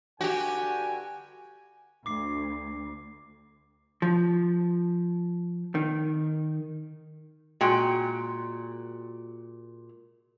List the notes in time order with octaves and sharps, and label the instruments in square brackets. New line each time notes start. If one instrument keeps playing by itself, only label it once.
[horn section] G2 D3 G#5 [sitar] F#4 G4
[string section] D2 [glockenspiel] D6 C7
[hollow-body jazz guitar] F3
D#3
[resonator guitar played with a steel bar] A#2 G#3 F#4 G5